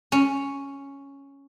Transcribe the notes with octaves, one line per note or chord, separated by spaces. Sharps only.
C#4